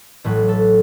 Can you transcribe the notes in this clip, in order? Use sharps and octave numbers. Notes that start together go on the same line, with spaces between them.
A1 A2 F#3 B4
A4